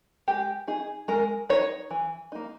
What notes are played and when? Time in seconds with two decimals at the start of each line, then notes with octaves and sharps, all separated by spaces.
0.28 G#3 G4
0.68 D#4 G#4
1.08 G#3 A#4
1.49 D#4 C#5
1.91 E3
2.32 A#3 D#4